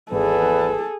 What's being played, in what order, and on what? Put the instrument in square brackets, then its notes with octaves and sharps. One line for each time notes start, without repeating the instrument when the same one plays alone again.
[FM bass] G#1 [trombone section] E2 B4 [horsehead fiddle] G#4 A4